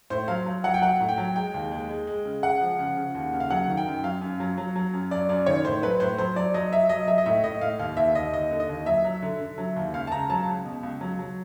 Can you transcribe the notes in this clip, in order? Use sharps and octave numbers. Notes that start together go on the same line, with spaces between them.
A2 C5
F#3 F5
F#3
F#3 F#5
G5
F#3 F#5
A2
G5
F#3
G#3 G5
D#2
G#3
G#3
G#3
C#3
G#3 F#5
F3
C#3
C#3
D#2
C#3
F5
F#3 F#5
D#3
G5
F#2
F#3 F5
F#2
F#3
F#3
F#3
F#2
F#3 D5
F#2 D5
D#3 C#5
A2 C5
F#3 B4
A2 C5
F#3 C5
F#3 D5
F#3 D#5
F#3 E5
F#3 D#5
F#3 E5
D#5
A2 E5
A2 D#5
A2 F5
D#2 F5
D#2 E5
D#2 D#5
D#2 D#5
D3
D#5
D#2
F#3 E5
F#3
D3
D3
F#3
D#2
C#2 F5
A5
C#2 A#5
F#3 A5
C#2
B2
C#2
F#3
F#3